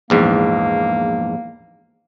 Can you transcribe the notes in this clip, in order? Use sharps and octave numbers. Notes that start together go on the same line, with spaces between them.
A#1 E2 G#2 A#3